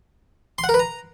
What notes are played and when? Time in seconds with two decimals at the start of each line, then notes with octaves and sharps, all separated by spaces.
0.58 C6
0.64 F#5
0.69 A#4
0.74 B4
0.79 A#5